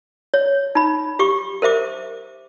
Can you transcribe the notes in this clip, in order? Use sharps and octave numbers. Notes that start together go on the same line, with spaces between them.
C#5
D#4 B5
G4 C#6 D6
A#4 C5 E5 D6